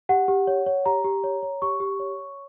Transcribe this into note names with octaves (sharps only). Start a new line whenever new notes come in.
G4 F#5
G4
C#5
C#5
G4 A#5
G4
C#5
C#5
G4 C#6
G4
C#5
C#5